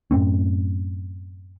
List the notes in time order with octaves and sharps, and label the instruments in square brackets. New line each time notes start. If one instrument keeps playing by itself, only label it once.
[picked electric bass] F#2 A2 C4 C#4